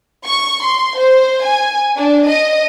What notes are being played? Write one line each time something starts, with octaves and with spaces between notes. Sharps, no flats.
C#6
C6
C5
G#5
D4
D#5